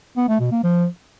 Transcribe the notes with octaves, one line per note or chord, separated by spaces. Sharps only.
B3
A3
B2
A#3
F3